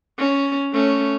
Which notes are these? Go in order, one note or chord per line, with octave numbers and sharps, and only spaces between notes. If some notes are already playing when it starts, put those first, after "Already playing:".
C#4
A3 C#4